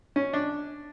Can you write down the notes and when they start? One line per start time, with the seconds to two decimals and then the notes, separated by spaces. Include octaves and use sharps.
0.16 C#4
0.33 D4